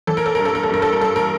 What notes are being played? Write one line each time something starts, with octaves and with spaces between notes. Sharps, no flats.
E3 A4
A#4
A4
G2 A#4
A4
A#4
A4
G2 A#4
A4
A#4
G2 A4
A#4